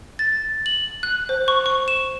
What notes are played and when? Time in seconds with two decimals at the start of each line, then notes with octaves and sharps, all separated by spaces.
0.19 A6
0.66 F#7
1.03 F#6
1.29 C5
1.48 C#6
1.66 C#6
1.88 E7